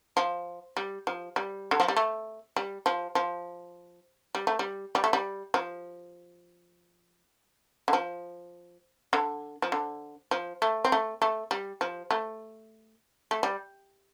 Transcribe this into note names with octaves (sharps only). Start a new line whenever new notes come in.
F3
G3
F3
G3
D3
F3
G3
A3
G3
F3
F3
G3
A3
G3
G3
A3
G3
F3
D3
F3
D3
F3
D3
F3
A3
C4
A3
A3
G3
F3
A3
A3
G3